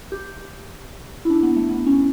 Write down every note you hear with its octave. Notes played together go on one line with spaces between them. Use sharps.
G4
E4
D4
B3
A3
B3
C#4